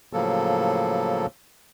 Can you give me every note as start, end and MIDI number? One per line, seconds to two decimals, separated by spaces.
0.13 1.26 45
0.13 1.26 49
0.13 1.26 53
0.13 1.26 54
0.13 1.26 58
0.13 1.26 69